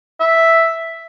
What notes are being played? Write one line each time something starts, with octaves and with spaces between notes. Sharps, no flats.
E5